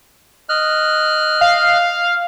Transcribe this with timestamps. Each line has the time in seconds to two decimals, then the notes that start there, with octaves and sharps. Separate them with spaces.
0.49 D#5 F6 F#6
1.41 F5